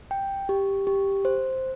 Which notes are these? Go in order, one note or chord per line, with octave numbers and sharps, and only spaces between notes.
G5
G4
G4
C5